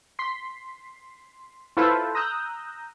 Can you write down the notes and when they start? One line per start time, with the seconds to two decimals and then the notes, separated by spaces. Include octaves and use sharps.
0.19 C6 B6 C7
1.77 E4 F4 A4 B4 C5 E5
2.15 A#5 D#6 E6 F#6 G6 A#6